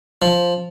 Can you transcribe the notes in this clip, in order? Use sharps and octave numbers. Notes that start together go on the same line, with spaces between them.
F3